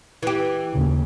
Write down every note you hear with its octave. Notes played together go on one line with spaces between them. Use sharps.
E3 G4
D#2 C#3